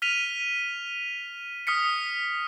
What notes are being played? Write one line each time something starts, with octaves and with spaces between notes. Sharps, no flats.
F6 B6 D#7 F7
D#6 F6 B6 C#7